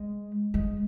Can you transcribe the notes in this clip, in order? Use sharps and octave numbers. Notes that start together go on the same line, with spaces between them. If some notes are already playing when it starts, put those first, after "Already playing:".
Already playing: G#3
G#3